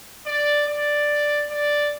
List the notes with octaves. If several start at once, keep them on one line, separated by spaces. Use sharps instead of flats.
D5
D5
D5